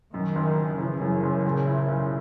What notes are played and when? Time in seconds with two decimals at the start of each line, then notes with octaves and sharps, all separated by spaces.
0.14 F#2 D#3
0.35 F#1
0.58 F#1
0.79 C#3 E3
1.01 F#2
1.23 F#1
1.45 A#2
1.67 E4
1.89 B1